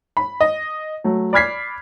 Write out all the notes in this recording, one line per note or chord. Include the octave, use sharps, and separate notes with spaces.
B5
D#5
F#3 A3
D5 B5 F6 G#6 B6 C7